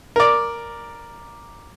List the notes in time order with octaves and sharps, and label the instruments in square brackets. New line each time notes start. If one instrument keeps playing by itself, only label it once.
[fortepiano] A#4 D5